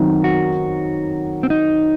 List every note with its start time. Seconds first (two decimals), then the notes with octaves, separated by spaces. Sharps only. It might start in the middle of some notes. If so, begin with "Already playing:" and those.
Already playing: D#3 F#3 C4 D#4
0.24 F#4
1.43 C4
1.50 D#4